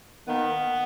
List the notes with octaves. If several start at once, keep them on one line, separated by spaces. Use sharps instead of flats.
D#3 A#3 B3